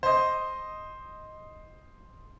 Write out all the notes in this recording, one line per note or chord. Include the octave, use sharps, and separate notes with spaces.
C5 D#5